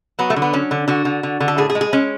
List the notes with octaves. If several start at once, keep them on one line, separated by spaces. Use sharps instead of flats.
F#3 B3
A3
D3
B3
F#3 C#4
D3
D3 F#4
D3
D3
D3
A4
A2 G#4
G#4
G#3
G#4
G#3 C#4